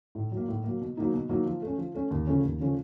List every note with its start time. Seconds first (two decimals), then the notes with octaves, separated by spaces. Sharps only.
0.15 A2
0.32 F#3
0.37 A#3
0.48 A2
0.64 F#3 A#3
0.81 B2
0.97 F#3 A#3 D#4
1.13 B2
1.29 F#3 A#3 D#4
1.46 F3
1.62 A3 C#4
1.78 F3
1.95 A3 C#4
2.11 D#2
2.27 C#3 F3 A3 C#4
2.44 D#2
2.60 C#3 F3 A3 C#4